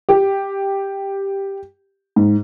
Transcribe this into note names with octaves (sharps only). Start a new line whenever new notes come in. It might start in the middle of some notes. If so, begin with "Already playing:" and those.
G4
G#2